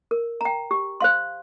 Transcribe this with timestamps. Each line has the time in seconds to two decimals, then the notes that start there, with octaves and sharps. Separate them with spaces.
0.11 A#4
0.41 G5 A#5
0.71 G4
1.00 C5 F5 C6